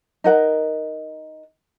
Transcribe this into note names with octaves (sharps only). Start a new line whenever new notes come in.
D#4 A#4 F#5